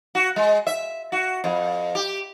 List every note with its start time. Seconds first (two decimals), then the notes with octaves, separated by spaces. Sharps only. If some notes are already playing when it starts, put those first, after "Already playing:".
0.15 F#4
0.36 G#3
0.67 E5
1.12 F#4
1.44 F2
1.95 G4